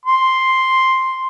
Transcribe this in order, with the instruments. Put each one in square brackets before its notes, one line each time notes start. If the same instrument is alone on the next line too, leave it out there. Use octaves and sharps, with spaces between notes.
[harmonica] C6